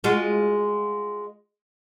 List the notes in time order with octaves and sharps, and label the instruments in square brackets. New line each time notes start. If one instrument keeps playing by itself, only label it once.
[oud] G#3 F4 F#4